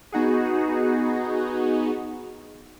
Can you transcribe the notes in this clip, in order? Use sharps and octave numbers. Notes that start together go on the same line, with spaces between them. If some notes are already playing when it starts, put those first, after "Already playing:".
B3 D#4 F#4 G#4